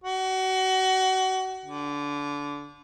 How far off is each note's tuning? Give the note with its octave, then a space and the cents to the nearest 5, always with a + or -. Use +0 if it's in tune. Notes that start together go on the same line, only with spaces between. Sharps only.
F#4 +30
D3 -25